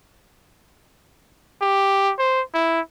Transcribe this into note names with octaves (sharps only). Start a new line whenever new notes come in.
G4
C5
E4